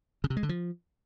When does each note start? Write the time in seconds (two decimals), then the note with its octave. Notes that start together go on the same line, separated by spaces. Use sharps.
0.24 C#3
0.30 C3
0.37 G#3
0.43 D3
0.49 F3